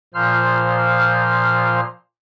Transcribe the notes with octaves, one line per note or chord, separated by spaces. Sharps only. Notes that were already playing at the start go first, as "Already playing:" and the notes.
A#2 F3 C5 F6